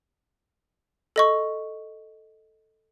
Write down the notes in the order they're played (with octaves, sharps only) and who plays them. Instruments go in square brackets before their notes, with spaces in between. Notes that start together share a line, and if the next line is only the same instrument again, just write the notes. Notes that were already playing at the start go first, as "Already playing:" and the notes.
[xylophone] A4 D#5 C#6